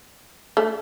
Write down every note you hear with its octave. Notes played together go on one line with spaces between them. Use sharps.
A3